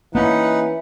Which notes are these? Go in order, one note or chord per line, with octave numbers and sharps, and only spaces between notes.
E3 A#3 C#4 D#4 B4 F#5